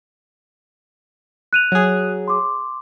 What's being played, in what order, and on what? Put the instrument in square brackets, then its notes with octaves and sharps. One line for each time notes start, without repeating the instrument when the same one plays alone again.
[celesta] F#6 D#7 F7
[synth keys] F#3 G#4
[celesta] C6 D6